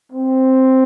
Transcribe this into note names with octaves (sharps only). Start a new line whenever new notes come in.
C4